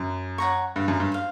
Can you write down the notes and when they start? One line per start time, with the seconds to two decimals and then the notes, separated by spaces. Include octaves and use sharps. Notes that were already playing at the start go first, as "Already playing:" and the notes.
Already playing: F#2
0.38 C#5 F#5 A#5 C#6
0.76 G2
0.88 F#2
1.00 G2
1.12 C5 F5